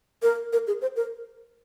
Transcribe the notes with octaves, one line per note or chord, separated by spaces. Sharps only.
A#4
A#4
G#4
C5
A#4